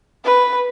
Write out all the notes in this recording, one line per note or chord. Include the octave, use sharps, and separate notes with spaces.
B4